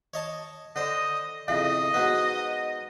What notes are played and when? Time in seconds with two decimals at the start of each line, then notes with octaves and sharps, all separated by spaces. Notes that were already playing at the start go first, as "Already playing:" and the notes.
0.14 C#5 D#5 A5
0.76 D3 C5 D#5
1.48 F2 A2 C#3 D#5
1.94 G#2 F#3 B3